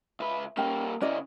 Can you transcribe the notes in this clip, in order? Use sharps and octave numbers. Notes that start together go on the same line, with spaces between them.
C#2 B4 E5
G3 A#3 C#4 G5
C#3 C#4 E4 D5 D#5